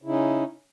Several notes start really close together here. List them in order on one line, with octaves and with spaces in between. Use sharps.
C#3 E4 D#4 C#4